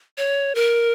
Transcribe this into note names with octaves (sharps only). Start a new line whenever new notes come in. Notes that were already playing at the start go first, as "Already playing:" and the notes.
C#5
A#4